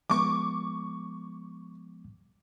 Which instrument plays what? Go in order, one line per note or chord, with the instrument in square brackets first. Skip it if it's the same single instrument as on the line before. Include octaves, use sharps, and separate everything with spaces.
[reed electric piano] F3 G#3 B3 [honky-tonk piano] C#6 D6